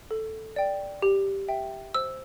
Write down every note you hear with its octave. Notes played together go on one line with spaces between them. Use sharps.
A4
D5 G5
G4
E5 G5
C5 E6